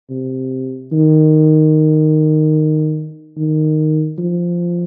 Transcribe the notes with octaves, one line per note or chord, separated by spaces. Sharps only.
C3
D#3
D#3
F3